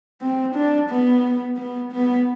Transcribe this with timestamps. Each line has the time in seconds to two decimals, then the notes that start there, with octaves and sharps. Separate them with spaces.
0.21 C4
0.55 D4
0.90 B3
1.57 B3
1.92 B3